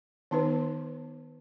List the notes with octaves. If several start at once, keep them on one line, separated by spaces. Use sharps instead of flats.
D#3 B3 D#4 B4